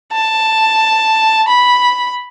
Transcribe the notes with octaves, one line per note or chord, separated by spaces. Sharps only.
A5
B5